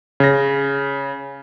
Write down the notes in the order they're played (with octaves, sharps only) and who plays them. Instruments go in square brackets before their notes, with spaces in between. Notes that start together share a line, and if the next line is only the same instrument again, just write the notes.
[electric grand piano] C#3 A#6